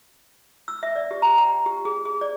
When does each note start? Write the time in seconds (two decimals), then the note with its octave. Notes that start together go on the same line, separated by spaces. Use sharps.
0.68 E6
0.83 E5
0.96 D5
1.11 G4
1.22 A#5
1.38 G5
1.66 G4
1.85 G#4
2.05 G#4
2.21 D5